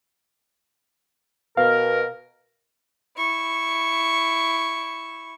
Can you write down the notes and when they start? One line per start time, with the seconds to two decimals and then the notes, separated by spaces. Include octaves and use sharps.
1.57 B2 A#4 F5
3.17 E4 C#6